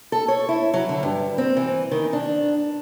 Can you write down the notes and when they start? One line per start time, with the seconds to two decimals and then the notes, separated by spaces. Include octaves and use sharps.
0.12 A4
0.28 C#5
0.49 E4
0.74 F#3
0.89 D3
1.03 G2
1.38 C4
1.57 E3
1.91 D#3
2.13 D4